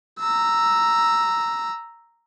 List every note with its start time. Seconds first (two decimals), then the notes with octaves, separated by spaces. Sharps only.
0.20 A#5 E6